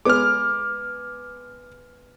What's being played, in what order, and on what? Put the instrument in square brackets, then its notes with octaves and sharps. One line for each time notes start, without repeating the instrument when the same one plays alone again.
[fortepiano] G#3 B3 [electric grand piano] D6 F6